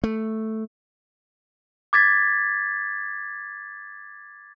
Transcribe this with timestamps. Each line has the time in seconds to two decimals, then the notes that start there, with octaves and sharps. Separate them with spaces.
0.04 A3
1.93 D6 G#6 A6 B6